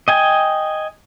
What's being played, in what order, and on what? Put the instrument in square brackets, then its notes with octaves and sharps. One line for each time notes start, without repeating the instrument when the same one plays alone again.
[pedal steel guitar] D#5 G5 G#5